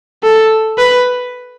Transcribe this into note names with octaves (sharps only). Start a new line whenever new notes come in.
A4
B4